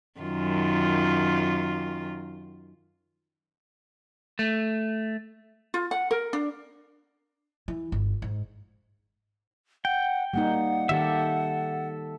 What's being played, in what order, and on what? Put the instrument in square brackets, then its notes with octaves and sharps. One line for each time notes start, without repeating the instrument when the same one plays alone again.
[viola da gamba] F#2 D#3 F4
[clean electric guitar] A3
[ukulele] F4
F#5
A#4
D4
[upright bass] E3
G1
G#2
[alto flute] F#5 [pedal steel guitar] G5
[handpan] G3 A#3 D#4 [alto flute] F#5
[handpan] D#3 G4 [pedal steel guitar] A4 E5